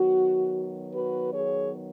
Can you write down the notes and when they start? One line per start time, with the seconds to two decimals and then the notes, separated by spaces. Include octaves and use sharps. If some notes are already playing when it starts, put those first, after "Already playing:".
Already playing: D#3 F#3 B3 F#4
0.93 F#4 B4
1.33 G#4 C#5